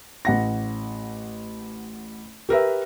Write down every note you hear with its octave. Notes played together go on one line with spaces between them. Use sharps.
A1 F#5 A#6
G4 A#4 B4 E5